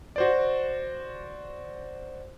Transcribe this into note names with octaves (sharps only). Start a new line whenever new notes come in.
F#4 C5 D5